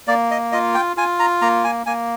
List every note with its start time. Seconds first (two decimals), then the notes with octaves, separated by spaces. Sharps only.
0.07 A#3 D5
0.31 D#5
0.52 F4 D#5
0.74 G5
0.97 F4 G#5
1.19 A#5
1.42 A#3 A#5
1.64 G#5
1.86 A#3 G#5